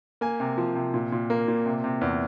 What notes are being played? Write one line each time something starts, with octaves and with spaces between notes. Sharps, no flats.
A#3 G#5
C3
F3
C3
A#2
A#2
A#3
A#2
C3
C3
E2